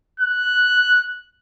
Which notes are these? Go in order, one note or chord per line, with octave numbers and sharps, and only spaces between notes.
F#6